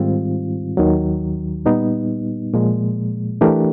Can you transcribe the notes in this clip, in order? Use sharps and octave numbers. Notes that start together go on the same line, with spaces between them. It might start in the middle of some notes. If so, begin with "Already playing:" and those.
Already playing: G#2 D#3 G3 C4 F4
D#2 D#3 F#3
A#2 G3 B3 D#4
A#2 F3 G#3
E3 A3 D4 G4 A#4